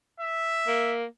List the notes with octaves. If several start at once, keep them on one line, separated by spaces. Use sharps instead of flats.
E5
A#3